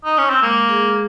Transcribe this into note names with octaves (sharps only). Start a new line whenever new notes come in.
D#4
C#4
C4
G#3 A#3
G#4